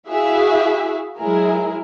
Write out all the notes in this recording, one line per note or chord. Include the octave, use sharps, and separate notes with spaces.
E4 F#4 G#4 E5 F5
F#3 G#3 E4 G#4 A#4